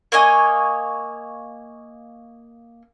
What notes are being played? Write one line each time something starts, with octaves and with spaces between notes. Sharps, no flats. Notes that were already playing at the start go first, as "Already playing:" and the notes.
A#3 C#5 D#5 G#5